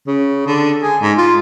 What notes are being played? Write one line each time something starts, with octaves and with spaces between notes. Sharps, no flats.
C#3
D3
G#4
G#2
F4